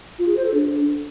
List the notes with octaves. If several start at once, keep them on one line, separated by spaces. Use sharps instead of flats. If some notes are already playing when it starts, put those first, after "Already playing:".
F4
G#4
C5
A4
D4